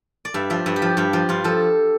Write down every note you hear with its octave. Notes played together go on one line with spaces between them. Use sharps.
D5
G2 E5
F3 E5
G2 E5
G4
F3
G2 G4
F3
G2 F4
F3 A4